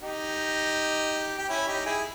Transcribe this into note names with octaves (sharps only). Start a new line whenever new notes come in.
D#4 G4
G4
C#4 E4
D#4 G4
E4 G#4